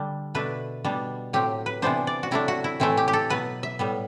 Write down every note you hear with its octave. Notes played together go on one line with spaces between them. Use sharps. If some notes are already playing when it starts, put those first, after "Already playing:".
Already playing: D3 G3 D4 A4
B2 A3 D4 B4
B2 G3 B3 D4
A2 F#3 C4 G4
B4
C3 E3 B3 D4 C5
D5
F#4
C3 F#3 A3 D4 E4
F#4
E4
A2 E3 A3 C4 E4
G4
G4
A4
B2 F#3 B3 B4
E5
A2 G3 B3